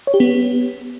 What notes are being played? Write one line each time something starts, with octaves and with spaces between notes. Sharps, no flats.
C#5
G4
B3